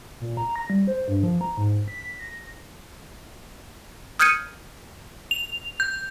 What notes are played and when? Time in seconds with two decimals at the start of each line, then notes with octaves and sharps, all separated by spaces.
0.20 A#2
0.37 A#5
0.56 A#6
0.70 G3
0.87 C5
1.08 G2
1.23 F3
1.41 A#5
1.57 G#2
1.88 B6
2.20 A#6
4.19 D#6 F6 G6 G#6 C#7 D#7
5.31 F7
5.80 G6